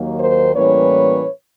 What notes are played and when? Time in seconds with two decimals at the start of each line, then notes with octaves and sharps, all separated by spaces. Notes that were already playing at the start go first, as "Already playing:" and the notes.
Already playing: D#2 D#3 F#3 A#3
0.19 A#4 C5
0.53 A2 E3 G3 A#3 C#4 B4 C#5